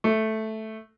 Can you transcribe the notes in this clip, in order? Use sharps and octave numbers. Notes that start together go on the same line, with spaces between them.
A3